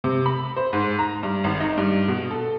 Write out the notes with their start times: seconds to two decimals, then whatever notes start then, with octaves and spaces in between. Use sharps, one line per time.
0.04 C3
0.26 B5
0.56 C5
0.73 G#2
0.99 A#5
1.23 G2
1.44 G#1
1.60 D#4
1.77 G2
2.08 B2
2.31 A4